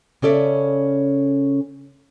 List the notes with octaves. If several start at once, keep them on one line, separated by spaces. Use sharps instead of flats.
C#3 C#4 A4 D5 E5